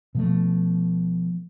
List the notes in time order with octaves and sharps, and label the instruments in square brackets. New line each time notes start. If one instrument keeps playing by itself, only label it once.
[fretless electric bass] B2 F3 A3